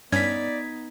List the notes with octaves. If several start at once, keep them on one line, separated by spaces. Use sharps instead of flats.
G2 B3 C#4 D#4 D5 G#6 B6